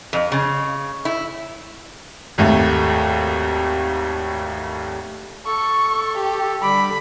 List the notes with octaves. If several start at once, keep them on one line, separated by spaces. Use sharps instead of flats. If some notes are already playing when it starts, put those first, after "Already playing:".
F2
C#3
E4
G#1 D#2 A3
A4 C#6
G4
D3 G3 B5 D6